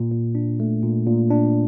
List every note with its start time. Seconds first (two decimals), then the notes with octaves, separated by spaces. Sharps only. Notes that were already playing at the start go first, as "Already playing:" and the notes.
Already playing: A#2
0.12 A#2
0.35 D4
0.60 A3
0.83 A#2
1.07 A#2
1.31 D4